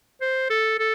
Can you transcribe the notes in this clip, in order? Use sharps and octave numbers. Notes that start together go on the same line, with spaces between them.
C5
A4
A4